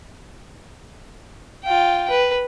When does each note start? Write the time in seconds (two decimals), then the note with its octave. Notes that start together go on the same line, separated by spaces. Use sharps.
1.64 F4 G5
2.10 B4